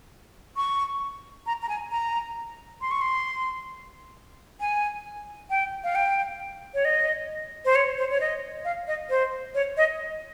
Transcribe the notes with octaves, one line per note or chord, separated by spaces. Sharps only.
C#6
A#5
A#5
G#5
A#5
C6
C#6
C6
G#5
G5
F5
G5
C#5
D#5
C5
C#5
C5
C#5
D#5
F5
D#5
C5
C#5
D#5